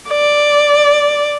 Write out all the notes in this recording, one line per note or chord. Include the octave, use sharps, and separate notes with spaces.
D5